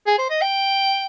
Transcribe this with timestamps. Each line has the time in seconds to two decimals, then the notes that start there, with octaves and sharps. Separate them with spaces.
0.07 G#4
0.18 C5
0.30 D#5
0.41 G5